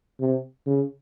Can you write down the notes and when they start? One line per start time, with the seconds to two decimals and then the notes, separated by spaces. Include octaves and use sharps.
0.20 C3
0.67 C#3